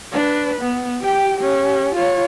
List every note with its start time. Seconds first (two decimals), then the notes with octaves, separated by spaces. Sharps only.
0.12 D4 B4
0.61 B3
1.01 G4 G5
1.37 C#4 G4
1.95 F4 C#5